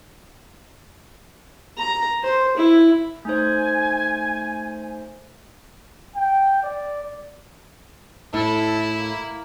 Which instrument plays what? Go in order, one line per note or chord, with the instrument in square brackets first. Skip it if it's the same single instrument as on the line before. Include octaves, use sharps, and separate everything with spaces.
[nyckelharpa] A#5
C5
E4
[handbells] A3 D#4 C5 [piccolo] G#5
[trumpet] G5
D5
[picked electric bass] A2 [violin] E4 [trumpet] A4
[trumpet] A#3